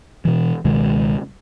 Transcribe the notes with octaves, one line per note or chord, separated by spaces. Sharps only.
B2 E3
C#2 B2 D#3 G#3